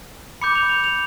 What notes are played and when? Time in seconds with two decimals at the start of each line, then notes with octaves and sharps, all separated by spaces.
0.41 B5 D6 G6 C#7
0.55 F7
0.69 F7
0.84 F7